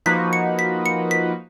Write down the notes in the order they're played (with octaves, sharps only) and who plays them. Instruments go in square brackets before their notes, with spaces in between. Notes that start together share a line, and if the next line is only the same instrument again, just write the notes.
[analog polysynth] F3 A#3 D#4 F#4 B4 [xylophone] B6
[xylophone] C#7
B6
C#7
B6